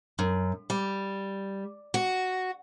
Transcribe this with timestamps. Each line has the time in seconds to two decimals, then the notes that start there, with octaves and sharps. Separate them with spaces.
0.19 F#2
0.70 G3
1.94 F#4